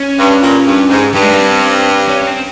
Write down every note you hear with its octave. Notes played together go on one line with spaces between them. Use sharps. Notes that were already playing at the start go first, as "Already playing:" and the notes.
Already playing: C#4
G2
A#2
G2
G#2
G2 G3
G#3
A#3
C4
C#4
C#4
C4